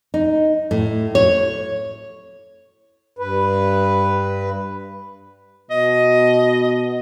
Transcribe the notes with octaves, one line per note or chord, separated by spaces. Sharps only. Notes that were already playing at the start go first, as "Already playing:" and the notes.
D#4
A2
C#5
G2 B4
B2 D#5